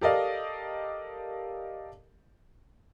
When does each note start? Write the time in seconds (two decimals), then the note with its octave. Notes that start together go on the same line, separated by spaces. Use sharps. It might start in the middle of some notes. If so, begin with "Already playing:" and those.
0.01 G4 A4 A#4 D5 D#5 F5